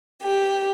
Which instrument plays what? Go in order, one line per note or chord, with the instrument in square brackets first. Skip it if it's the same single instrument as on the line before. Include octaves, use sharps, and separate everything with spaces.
[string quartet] G4